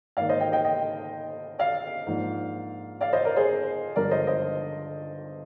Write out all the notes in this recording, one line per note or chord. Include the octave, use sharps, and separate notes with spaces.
G#2 D#3 A#3 D5 F5
C5 D#5
D#5 G5
D#5 G5
D#5 G5
D5 F5
G#2 F3 A#3 D4
D5 F5
C5 D#5
A#4 D5
G#4 C5
G1 G2 D3 F3 G#3 A#4 D5
C5 D#5
C5 D#5